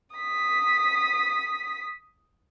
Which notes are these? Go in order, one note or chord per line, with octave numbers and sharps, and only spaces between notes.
D#6 B6